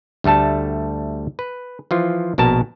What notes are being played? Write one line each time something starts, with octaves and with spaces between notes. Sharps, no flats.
D2 G3 A3 A4 A5
B4
E3 F3 F4
A#1 B2 A#4 A5